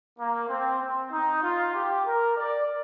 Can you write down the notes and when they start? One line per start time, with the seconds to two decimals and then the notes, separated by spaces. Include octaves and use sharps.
0.19 A#3
0.49 C4
0.81 C4
1.11 D#4
1.42 F4
1.74 G4
2.05 A#4
2.36 D5